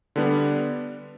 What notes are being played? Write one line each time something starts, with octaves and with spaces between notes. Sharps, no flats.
D3 G3 B3 D4